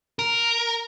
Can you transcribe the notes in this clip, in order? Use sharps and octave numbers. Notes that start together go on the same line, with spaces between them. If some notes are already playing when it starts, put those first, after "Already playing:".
A#4